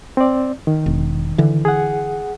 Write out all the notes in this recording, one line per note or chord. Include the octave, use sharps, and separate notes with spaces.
C4 D5
D#3
E1
D3 E3
G#4 F#5